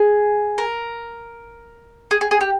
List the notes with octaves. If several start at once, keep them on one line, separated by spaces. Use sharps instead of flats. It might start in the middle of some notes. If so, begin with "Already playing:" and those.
Already playing: G#4
A#4
G#4
G#4
G#4
G4